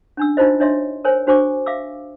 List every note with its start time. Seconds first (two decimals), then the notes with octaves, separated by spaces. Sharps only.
0.17 C#4 D4 E6
0.37 D4 D#4 F4 F#4 C5 D#5
0.60 D4 C#5 D#5 E5 C6
1.05 A#4 C5 C#5 G#5
1.27 D4 F#4 C5 G#5 C#6 D6
1.66 E5 F5 D6 E6